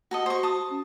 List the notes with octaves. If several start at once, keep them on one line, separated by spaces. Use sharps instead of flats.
F#4 A4 D#5
F#4 C5 C#6
A5 D#6
C#4